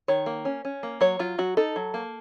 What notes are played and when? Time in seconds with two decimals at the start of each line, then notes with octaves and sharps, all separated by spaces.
0.08 D#3 C#5
0.26 A#3
0.45 C#4
0.65 C#4
0.83 A#3
1.01 F#3 C#5
1.19 F#3 F4
1.38 F#3 F#4
1.57 D#4 A4
1.76 F#3
1.94 A#3